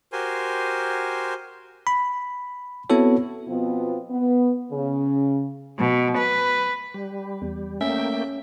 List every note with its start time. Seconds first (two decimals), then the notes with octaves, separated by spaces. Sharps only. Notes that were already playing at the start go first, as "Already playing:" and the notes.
0.12 F#4 G4 A#4 C5 G#5 C6
1.87 B5
2.90 B3 C4 E4 F#4 A4 C#5
3.48 B2 F3 B3 C4 F4
4.10 B3
4.72 C#3
5.79 B2
6.18 B4
6.94 G3
7.42 E2
7.81 A3 A#3 C#4 E5 G5